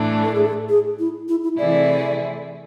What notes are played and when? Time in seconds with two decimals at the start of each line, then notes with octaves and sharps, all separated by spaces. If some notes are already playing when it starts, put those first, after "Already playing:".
Already playing: A2 E3 A3 D4
0.23 A4
0.35 G#4
0.45 A4
0.69 G#4
0.99 E4
1.28 E4
1.43 E4
1.57 C3 E3 A3 E4 G#4 D5